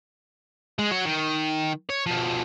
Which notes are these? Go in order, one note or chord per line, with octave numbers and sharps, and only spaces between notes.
G#3
F#4 C#5
D#3
C#5
B2 F3